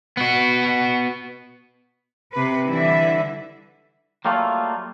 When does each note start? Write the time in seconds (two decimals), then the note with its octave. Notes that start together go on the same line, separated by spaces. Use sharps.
0.17 B3 F#4
2.32 C3 B4
2.66 D3 E3 G3 E4 E5
4.25 F#3 G3 A3 A#3 F4